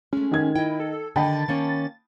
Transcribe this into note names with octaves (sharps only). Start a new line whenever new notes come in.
G#3 A3 C#4
D#3 G#6
E4 D#5 G5
A4
D3 D#3 D#5 G5 A5 B5 A6
D#3 A#3 C#4